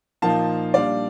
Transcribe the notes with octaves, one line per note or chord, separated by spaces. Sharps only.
A#2 F3 A#3 D#4 F5 A5
A#2 G3 D4 D5 F5